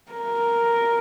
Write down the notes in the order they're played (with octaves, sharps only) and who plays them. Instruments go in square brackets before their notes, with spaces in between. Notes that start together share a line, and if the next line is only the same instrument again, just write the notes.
[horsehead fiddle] A#4